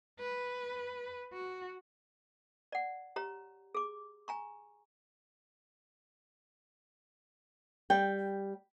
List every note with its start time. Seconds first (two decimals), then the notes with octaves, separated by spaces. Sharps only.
0.20 B4
1.33 F#4
2.72 D5 F#5
3.16 G4 C#5 A#5
3.75 G#4 D6
4.28 G#5 A#5 C#6
7.90 G3 G5